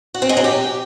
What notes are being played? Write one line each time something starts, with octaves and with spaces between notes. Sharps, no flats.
F#4
C4
G#3
F#3
G4